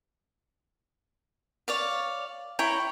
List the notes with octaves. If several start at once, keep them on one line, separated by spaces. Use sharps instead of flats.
C#5 D5 F5
E4 C#5 G5 A#5